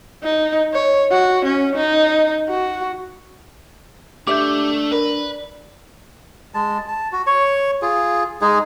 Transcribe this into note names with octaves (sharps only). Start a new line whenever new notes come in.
D#4
C#5
F#4
C#4
D#4
F#4
A3 D4 G4 E5 D6 G6
A#4 B4 D5
G#3 A5
A5
F#4
C#5 C#6
F4 G#4
G#3 D#4 G#4